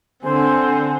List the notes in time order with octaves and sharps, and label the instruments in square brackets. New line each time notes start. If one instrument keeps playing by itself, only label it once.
[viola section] D3 F#5 [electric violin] C4 [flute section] C5 G#5